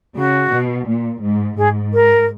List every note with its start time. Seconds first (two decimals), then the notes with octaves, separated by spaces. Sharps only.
0.15 C#3 F#4
0.51 B2
0.87 A#2
1.22 G#2
1.57 G#2 G#4
1.93 A#4